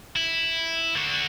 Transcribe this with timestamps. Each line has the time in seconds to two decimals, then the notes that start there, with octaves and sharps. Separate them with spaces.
0.16 E4
0.96 D3 F#4